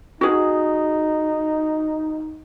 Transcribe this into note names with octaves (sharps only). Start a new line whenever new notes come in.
D#4 F#4 G#4